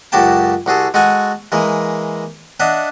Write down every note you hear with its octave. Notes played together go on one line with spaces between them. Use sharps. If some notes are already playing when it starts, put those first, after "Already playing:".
C#2 F#2 F#4 G4 G5 A5
C2 F#4 G#4 A4
G#3 F#4 A4 F#5 G#5
E3 G#3 A#3
D4 D#5 E5 F#5